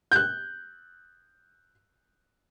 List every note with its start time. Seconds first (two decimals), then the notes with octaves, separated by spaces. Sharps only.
0.12 F#6 G6